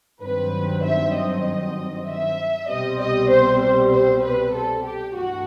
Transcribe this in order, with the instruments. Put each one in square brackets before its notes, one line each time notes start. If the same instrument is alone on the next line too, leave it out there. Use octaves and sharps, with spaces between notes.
[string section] G2 D#3 F#3 C4 B4
E5
D#5
E5
C2 B2 G3 C4 D#5
D#5
C5
C5
C5
B4
A4
G4
G2 E3 A3 F#4